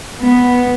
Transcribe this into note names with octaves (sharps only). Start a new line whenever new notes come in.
B3